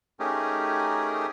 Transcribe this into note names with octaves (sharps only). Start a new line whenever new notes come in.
A3 C#4 D#4 G4 G#4 A#4